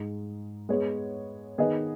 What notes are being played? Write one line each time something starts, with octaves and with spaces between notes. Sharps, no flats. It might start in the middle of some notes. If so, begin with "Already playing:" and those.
Already playing: G#2 G#3 D#4
G#3 B3 G#4 C#5
D#3 B3 G#4 B4 D#5